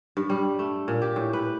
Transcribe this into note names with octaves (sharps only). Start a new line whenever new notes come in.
G2
G3
A3
A#2
G4
A2
B4